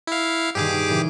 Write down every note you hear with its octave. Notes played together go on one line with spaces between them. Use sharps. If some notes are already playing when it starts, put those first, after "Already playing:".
E4 F5
G2 B2 D#3 G4 G#4 D6
A#2 C#3 E3